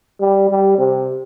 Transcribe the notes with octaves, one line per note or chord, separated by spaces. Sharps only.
G3
G3
C3